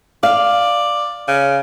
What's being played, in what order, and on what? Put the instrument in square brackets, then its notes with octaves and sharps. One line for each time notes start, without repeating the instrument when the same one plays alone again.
[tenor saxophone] D5 [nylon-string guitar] F5
[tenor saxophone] C#3